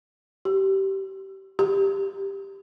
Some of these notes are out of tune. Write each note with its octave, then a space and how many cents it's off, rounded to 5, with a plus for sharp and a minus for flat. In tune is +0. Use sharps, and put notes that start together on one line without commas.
G4 -25
G4 +10